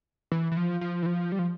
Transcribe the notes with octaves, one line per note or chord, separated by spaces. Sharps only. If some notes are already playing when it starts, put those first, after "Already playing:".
E3
E3
F3
F3
E3
F3
G3
F3